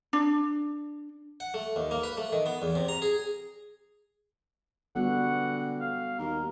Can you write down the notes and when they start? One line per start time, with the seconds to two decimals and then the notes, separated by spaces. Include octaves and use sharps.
0.13 D4
1.40 F#5
1.54 A3
1.76 D#2
1.91 A#3
2.03 B4
2.17 A3
2.32 D#3
2.46 B3
2.62 E2
2.75 C3
2.88 A#5
3.02 G#4
4.96 D3 G3 B3 F#4 F#5
5.80 F5
6.19 D#2 A#4